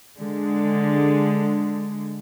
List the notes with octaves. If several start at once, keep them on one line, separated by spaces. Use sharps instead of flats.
D3 G#3